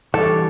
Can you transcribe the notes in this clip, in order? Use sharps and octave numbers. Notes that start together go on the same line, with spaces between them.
E3 G3 D4 G4 A4 C#5